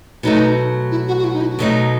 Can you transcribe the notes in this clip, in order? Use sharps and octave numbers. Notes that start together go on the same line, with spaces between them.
B2 F#3 A3 D#4
E4
F#4
F#4
E4
D#4
E4
F#4
B2 F#3 A3 D#4